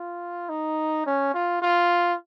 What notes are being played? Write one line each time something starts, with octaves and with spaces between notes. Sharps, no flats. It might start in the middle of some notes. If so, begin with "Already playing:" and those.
Already playing: F4
D#4
C#4
F4
F4